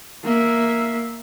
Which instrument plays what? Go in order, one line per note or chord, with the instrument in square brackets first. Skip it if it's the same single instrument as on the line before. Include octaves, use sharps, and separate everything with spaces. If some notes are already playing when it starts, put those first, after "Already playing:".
[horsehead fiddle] A#3 E5